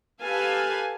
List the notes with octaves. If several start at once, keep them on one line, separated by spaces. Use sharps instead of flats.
G4 A4 B4 F5 G#5 A5